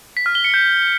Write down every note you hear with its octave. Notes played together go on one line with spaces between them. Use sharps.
B6
F6
G7
C#7
G6